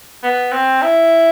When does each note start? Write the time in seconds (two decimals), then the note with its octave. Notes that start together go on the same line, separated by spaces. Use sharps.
0.23 B3
0.52 C4
0.82 E4